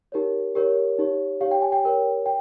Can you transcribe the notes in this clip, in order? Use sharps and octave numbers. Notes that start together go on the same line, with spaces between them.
D#4 G4 A#4 C#5
G4 A#4 C#5
D#4 G4 C#5
G4 C#5 F5
G5
G#5
G5
G4 A#4 C#5
G5